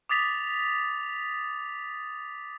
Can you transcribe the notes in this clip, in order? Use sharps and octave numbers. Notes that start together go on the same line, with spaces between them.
D6 D#6 A6 B6 F7